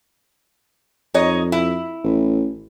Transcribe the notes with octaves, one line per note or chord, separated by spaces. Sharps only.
F2 D#4 C#5 D#5
E4
A1